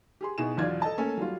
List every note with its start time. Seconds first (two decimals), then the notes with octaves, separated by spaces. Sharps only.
0.21 G4 G#4 C6
0.38 B2 D#4 E4 G#4 E7
0.57 B1 E2 F#3 F4 D5 G#6
0.82 A4 D#5 A5
0.97 A3 A#3 C#4 A4 G#5
1.17 F#3 G3 F4